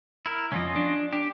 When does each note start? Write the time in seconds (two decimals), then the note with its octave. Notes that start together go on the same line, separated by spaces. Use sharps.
0.26 E4 A#4
0.52 C2 F2 C#4 F4 D#5
0.76 D4
1.13 D4 G4